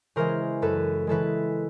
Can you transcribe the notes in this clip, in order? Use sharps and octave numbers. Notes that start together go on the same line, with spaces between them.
C#3 E3 G#3 A#4 C5
F#2 A4 B4
C#3 E3 G#3 A4 B4